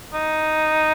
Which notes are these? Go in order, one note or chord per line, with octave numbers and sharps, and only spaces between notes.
D#4